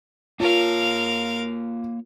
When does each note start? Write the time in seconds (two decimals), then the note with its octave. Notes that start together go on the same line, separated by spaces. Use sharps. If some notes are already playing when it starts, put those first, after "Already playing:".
0.40 A#3 F4 A#4 C#5 F5